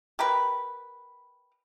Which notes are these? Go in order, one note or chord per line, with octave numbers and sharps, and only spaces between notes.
G4 A#4 B4